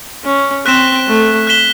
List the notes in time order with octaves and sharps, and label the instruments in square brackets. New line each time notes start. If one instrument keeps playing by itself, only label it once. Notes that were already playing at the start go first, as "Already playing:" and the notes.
[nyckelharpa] C#4
[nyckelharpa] C4 [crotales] F#6 B6 E7 G7
[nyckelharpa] A3
[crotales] F#6 B6 E7 G7